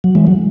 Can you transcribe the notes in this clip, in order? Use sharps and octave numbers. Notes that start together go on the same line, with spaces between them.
F#3
E3 G#3
F#3